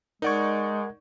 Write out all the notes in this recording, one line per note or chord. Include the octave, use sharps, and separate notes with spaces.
G#3 D#4 A#4 D5 F#5 C#6 G#6